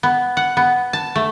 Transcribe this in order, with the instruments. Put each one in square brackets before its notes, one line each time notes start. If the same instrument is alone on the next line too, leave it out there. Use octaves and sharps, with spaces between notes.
[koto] B3
F#5
B3
A5
A3